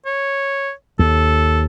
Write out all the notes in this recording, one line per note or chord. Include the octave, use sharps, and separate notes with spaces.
C#5
D#2 A4